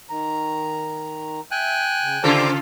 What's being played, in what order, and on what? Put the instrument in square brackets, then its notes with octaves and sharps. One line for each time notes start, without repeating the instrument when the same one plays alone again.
[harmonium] D#3 A#5
[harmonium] E5 [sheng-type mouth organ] G5 G#5 F#6
[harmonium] C#3
[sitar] C#3 F4 A4 [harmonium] G4 D5 [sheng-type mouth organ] C5 A#5 D6